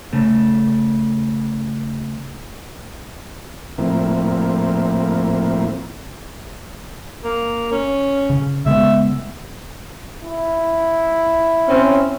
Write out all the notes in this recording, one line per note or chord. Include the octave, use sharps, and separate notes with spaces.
C#3 A3
A2 F3 A#3 C4 E4
A#3
C#4
C#3
C#3 G#3 B3 E5
E4
C4 C#4